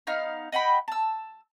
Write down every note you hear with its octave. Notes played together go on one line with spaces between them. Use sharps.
B3 D#4 F5 F6
D#5 F#5 G5 B5
A5 E6